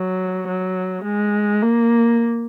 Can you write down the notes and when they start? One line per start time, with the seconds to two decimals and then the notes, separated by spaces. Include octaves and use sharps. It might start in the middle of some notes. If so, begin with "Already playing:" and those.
Already playing: F#3
0.48 F#3
1.04 G#3
1.62 A#3